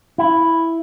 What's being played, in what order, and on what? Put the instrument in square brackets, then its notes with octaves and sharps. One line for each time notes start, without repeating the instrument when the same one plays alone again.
[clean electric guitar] E4